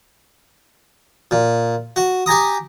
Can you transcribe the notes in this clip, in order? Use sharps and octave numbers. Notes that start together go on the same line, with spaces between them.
A#2
F#4
G4 G#5 A#5 D#6